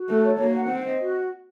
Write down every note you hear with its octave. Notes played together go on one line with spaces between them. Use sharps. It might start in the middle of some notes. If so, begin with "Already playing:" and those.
Already playing: F#4
A3 A4
C#5
A#3 F#4
F#5
C4 C5
D#5
F#4